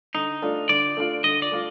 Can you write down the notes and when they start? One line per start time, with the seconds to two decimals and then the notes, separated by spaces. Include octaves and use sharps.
0.15 D3 D#4
0.42 A3 D4 F4
0.69 D3 D5
0.97 A3 D4 F4
1.24 D3 D#5
1.42 D5
1.51 A3 D4 F4